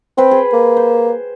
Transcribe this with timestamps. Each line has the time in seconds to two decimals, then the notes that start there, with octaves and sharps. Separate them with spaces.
0.18 C4 B4 C5 G5
0.31 G#4
0.53 A#3
0.77 C5